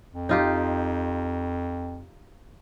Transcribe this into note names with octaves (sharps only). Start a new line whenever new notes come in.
F2
D#4 F4 G4